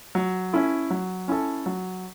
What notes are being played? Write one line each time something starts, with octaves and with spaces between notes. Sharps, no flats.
F#3
C#4 E4 A4
F#3
C#4 E4 A4
F#3